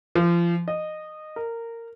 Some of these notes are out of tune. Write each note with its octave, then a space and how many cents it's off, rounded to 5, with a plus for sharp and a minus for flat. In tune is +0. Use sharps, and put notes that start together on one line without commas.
F3 -30
D#5 -15
A#4 -15